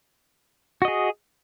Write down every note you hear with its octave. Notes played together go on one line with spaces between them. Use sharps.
F#4 G#4 D#5